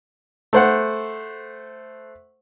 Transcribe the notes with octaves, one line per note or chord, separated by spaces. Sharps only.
A3 C5 F#5